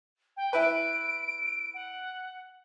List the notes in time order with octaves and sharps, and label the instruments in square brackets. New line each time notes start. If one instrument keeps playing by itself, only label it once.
[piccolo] G5
[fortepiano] E4 B4 [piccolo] D7
[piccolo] F#5